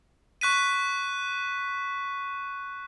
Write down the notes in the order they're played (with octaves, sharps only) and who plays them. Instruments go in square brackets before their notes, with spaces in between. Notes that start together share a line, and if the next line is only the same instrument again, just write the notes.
[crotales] C#6 F#6 B6 D#7